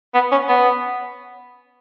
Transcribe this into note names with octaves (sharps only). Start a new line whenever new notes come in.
B3
C#4
B3